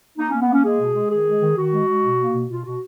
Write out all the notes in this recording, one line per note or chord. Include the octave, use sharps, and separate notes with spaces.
A#3 D#4
A#3 C#4
B3
A#3 C#4
G#3 G#4
B2
G#3
D#3 G#4
G#3
D#3
D#3 F#4
G#3
G#3
B2
A#3
B2
B2 F4
B2 F#4